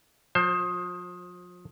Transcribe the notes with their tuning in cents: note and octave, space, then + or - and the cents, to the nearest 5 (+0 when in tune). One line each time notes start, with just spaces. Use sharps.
F3 +35 C5 +15